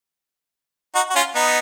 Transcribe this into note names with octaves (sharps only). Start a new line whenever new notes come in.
D#4 F#4
F#4
C#4 F4
B3 D#4